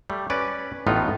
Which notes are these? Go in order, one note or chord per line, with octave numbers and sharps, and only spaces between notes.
G3 A3
C#4 B4 D5
A1 A2 B3 D#4 F4